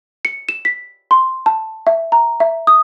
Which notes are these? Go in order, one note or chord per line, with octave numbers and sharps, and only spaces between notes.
C#7
E7
B6
C6
A5
E5
A#5
E5
D#6